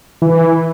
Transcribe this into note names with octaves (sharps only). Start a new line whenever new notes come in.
E3